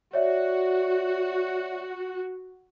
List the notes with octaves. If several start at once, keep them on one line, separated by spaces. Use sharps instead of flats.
F#4 C#5 D5 E5